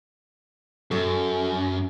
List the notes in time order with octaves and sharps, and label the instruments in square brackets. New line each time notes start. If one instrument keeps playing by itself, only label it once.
[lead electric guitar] F#2 [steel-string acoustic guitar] F#3 A4